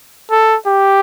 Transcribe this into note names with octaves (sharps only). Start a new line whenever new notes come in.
A4
G4